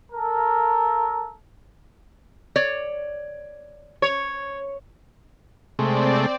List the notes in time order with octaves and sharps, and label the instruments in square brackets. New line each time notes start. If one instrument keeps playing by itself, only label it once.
[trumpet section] A4 A#4
[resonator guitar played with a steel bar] C#5 D5
[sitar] C#5
[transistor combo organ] C3 G#3 A3 [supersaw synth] C4 D5